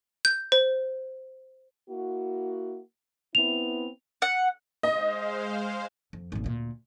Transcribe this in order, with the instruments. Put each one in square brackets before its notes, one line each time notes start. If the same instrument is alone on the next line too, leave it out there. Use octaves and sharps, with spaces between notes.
[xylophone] G6
C5
[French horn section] A#3 E4 F#4
[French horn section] B3 C4 E4 [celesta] F7
[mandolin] F#5
[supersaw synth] G#3 C5 F5 [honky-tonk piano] D#5
[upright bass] F2
G#1 A#2
D2 A#2